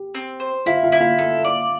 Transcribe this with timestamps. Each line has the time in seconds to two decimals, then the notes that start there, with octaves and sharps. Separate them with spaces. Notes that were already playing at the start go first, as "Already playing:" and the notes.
Already playing: G4
0.15 C4
0.40 C5
0.66 E4 F4 F5
0.83 F4 F5
0.92 E4
1.00 F4 F5
1.18 A4
1.44 D5